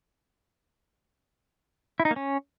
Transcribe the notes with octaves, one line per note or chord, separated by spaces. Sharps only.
E4
D#4
A#3
C#4